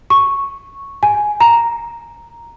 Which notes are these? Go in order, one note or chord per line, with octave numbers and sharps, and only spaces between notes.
C#6
G#5
A#5